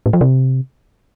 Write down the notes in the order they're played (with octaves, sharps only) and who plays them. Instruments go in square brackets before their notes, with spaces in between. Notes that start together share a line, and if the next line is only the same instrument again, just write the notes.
[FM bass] A2
F3
C3